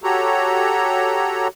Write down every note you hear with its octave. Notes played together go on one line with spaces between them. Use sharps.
F#4 G4 A4 C#5 A#5